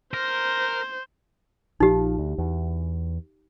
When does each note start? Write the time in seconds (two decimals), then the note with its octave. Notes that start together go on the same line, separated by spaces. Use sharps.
0.14 A#4 C5
1.80 A#1 F3 D#4 G4
2.18 D2
2.38 E2